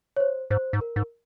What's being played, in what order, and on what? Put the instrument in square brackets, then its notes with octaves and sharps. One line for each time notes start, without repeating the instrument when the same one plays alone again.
[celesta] C#5
C5
[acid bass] G#2 [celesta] C5
[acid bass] G#2
[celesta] A#4
[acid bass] G#2